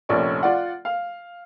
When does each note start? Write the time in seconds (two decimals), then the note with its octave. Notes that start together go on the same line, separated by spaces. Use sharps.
0.09 F1 A#1 C#4 D5 C#6
0.43 F4 D5 F#5
0.85 F5